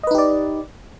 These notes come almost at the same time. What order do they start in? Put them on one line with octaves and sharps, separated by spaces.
D#5 B4 D#4 G4 D5